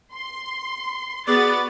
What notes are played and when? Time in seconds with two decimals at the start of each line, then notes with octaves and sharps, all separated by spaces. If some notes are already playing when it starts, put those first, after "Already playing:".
0.13 C6
1.27 B3 F#4 G#4 D5 A6